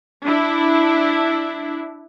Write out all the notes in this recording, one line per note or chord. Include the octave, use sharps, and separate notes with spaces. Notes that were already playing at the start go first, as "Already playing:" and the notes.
D4 E4